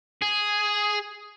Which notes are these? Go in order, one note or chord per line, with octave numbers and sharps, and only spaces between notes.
G#4